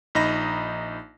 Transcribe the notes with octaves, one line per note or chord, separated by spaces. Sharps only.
A#1 D#4 D#5 A#5 B5 A#6